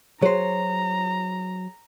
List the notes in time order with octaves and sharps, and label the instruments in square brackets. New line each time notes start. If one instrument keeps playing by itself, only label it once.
[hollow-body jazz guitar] F#3 C5 [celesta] G#4 C#5 [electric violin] A#5